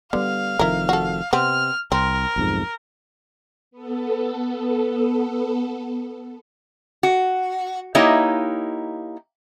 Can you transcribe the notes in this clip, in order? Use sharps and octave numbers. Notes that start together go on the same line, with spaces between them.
D3 G3 B3 F5
F1 F2 D#3 E4 A#4
F#4 A4
C3 B3 C4 F6
C2 C4 A#4
B1 F2 G#2
B3 A4
F#4
A#3 D#4 E4 G4 C#5 D#5